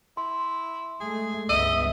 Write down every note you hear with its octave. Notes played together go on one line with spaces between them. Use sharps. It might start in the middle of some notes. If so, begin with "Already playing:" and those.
E4 C6
G#3 A3 G#4
G1 C#2 B3 D#5 E5 E6 D#7